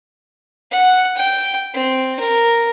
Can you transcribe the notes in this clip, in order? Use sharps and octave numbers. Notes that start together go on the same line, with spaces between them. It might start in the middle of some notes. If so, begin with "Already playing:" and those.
F#5
G5
C4
A#4